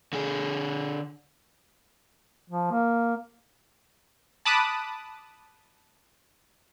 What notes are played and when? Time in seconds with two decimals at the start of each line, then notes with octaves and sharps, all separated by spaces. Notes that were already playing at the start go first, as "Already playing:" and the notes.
0.13 D3 G#4
2.50 F3
2.71 A#3
4.45 A5 B5 D6 D#6 F#6